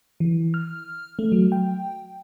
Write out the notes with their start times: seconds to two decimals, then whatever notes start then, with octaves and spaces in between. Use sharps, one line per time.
0.20 E3
0.54 F6
1.19 A3
1.32 F#3
1.52 G5